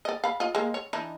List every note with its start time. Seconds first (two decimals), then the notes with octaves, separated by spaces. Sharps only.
0.05 D5 D#5
0.24 F5 B5
0.40 F4 D#5
0.55 G#3 A#3
0.74 C#5
0.93 E3 D4 D#4